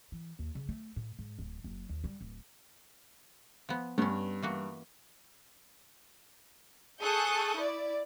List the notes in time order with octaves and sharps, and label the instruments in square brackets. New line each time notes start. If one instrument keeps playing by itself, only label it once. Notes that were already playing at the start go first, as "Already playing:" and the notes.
[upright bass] E3
D#2
C#3
A3
A2
G#2
D1
F#1
D#2
G3
D1
[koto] F3 B3
[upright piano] G2 [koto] B3 C#4
[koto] E3 A#3 F#4
[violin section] G#4 A4 C#6 D#6 F#6 G6
E4 D5